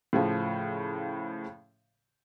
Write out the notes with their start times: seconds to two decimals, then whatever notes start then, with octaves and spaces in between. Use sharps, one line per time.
0.13 A2 C#3 F3